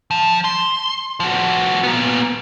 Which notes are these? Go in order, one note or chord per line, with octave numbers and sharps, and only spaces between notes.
F3
C6
F3 F#4
A#2 B3